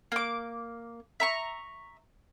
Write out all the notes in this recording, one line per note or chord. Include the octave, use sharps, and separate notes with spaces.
A#3 D6
E5 A#5 C#6